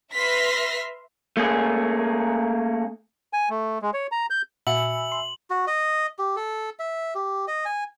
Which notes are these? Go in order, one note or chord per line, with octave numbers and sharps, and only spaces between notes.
B4 E5 C6 F6 A#6 B6
A3 A#3 C#4 G#4
G#5
A3
G#3
C#5
A#5
G6
A#2 F#4 E5 G#5 B5 E6 C#7 F#7
C6
F#4
D#5
G4
A4
E5
G4
D#5
G#5